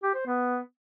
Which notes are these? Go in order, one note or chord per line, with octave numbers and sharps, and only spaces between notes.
G4
C5
B3